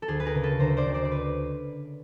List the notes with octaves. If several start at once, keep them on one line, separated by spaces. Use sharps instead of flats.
A4
D2 G#4
B4
G#4 A#4
C#3
A4 B4
D2 A#4 C5
C5 D5
D2
C5 D5
D5
B4